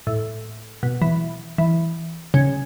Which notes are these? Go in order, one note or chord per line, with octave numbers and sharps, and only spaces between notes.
A2
B2
E3
E3
C#3